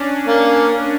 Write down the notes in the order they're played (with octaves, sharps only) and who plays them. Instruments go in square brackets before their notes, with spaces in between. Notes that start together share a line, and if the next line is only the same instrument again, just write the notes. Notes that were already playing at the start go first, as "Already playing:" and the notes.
Already playing: [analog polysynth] C#4 D4
[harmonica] A#3